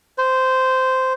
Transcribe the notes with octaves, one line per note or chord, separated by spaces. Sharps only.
C5